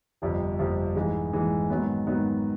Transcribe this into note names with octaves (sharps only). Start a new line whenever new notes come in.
G1 F2 C3 F3
G1 F2 C3 F3
G#2 E3 G#3
G#2 E3 G#3
G#2 D#3 F#3 B3
G#2 D#3 F#3 B3